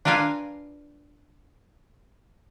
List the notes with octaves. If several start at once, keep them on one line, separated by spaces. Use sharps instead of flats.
D4 F4 A#4 B4 F5 G#5